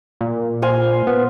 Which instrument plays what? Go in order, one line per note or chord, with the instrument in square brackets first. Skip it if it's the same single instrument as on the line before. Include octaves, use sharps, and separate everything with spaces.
[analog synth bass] A#2
[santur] C5 F5 G#5
[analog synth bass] B3